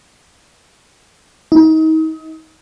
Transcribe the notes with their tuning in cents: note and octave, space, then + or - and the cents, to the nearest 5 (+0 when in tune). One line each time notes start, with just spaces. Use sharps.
D#4 +35